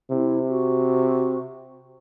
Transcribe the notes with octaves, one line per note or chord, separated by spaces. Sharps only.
C3 E4
F#4